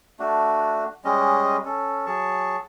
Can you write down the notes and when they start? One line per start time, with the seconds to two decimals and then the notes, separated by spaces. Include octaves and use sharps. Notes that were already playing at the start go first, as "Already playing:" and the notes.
0.19 A3 D4 F#4
1.04 G3 G#3 C#4 D#5
1.65 C#4 A4
2.06 F#3 G#4 A5 C#6